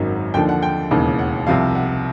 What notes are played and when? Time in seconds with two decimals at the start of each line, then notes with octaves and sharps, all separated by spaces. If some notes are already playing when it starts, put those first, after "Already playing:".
Already playing: G#1 F#2 D#3 F#3
0.34 D#2 D3 F3 G5
0.49 F#5
0.63 G5
0.91 E1 D#2 C#3 E3
1.19 F#5
1.47 C2 C3 F3 F5
1.75 F#5